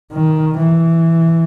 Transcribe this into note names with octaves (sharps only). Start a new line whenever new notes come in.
D#3
E3